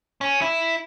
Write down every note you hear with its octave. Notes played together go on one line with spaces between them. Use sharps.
C#4
E4